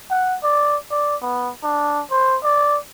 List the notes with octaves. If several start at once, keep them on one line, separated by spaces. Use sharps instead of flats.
F#5
D5
D5
B3
D4
C5
D5